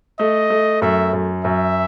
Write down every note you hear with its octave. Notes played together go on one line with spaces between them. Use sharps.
A3 D#5
A3
F#2 E5
F#2
F#2 E5